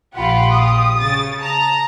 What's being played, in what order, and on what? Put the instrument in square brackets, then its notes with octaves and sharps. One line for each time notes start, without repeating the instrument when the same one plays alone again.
[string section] A#1 F4 G4 [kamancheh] F#5 B5
[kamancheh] D#6
[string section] C#3 A6
A5 A#5